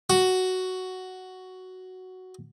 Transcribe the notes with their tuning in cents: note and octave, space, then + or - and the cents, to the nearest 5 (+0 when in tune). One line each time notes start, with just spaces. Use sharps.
F#4 +5